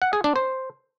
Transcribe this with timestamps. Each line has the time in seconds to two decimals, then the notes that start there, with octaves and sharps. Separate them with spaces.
0.02 F#5
0.13 G#4
0.24 D4
0.36 C5